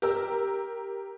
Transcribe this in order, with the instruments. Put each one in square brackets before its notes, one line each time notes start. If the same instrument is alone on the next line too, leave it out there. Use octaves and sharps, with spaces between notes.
[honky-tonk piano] G4 A#4 E6